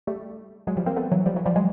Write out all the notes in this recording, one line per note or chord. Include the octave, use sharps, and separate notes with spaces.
G3 A3
F#3 G#3
F3 G3
A#3 C4
A3 B3
E3 F#3
F3 G3
E3 F#3
F3 G3
F#3 G#3